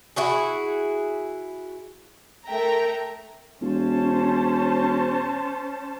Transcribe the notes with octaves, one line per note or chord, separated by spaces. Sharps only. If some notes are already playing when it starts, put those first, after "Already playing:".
E4 F#4 G#4
A3 A4 A#4 E5 G5 A#5
E1 C#4 C5 A5